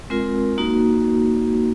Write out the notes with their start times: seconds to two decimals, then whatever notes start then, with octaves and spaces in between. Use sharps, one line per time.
0.10 G#3 C4 F4 A#4
0.58 A#3 D#4 F#4